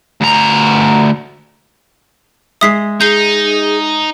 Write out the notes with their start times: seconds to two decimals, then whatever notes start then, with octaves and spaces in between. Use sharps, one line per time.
0.21 D2 A#5
2.61 G#3 E5 D#6 B6 C7
3.01 D#4 G#4 G6 C7